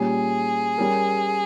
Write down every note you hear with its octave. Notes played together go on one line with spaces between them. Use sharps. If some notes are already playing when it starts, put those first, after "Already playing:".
Already playing: A#2 G3 C#4 G#4
G3 C#4 G4 A#4